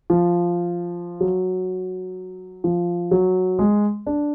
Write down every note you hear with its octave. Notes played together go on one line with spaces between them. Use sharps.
F3
F#3
F3
F#3
G#3
D4